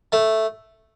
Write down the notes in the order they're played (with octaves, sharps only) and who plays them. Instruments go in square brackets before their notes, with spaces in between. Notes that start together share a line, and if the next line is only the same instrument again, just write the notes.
[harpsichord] A3